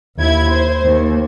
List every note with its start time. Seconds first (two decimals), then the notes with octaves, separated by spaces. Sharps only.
0.19 D#2 E4 G#6
0.50 C5
0.85 D#2